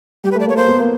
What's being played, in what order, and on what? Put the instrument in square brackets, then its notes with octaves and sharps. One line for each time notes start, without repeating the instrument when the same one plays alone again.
[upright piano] G3 [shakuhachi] G4
[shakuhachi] B4
[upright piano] A3
[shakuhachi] D5
[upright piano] A#3
[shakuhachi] C#5
[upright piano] A#3 [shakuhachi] C5
[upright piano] B3
A#3